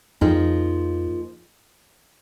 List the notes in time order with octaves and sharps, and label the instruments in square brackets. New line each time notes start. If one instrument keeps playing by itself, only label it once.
[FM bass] F2 [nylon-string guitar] F3 A#3 D#4 G#4